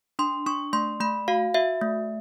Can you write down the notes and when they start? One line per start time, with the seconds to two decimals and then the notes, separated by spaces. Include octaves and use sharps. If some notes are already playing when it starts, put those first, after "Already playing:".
0.19 D4 C6
0.46 D4 C#6
0.73 A3 C6
1.00 A3 B5
1.28 F#4 F5
1.54 F#4 E5
1.82 A3